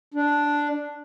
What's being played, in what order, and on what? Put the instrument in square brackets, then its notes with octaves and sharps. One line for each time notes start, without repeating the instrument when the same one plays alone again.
[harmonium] D4